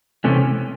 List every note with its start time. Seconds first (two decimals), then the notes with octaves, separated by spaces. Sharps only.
0.24 C3 E3 A3 C#4